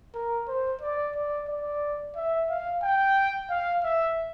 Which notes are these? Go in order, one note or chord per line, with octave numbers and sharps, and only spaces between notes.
A#4
C5
D5
D5
D5
E5
F5
G5
F5
E5